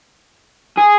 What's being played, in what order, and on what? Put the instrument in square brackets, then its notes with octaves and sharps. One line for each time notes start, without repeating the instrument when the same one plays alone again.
[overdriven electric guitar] G#4